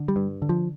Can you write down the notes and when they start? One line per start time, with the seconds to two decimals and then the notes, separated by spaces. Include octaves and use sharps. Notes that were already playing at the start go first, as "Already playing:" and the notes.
Already playing: D3
0.08 G3
0.16 G2
0.42 D3
0.49 F3